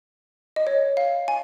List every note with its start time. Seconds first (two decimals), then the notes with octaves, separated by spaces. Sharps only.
0.56 D#5
0.67 C#5
0.97 F5
1.28 G#5